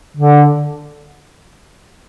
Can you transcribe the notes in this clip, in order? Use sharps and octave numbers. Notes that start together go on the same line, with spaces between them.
D3